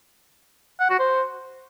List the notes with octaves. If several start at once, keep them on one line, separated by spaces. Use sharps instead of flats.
F#5
F#4
C5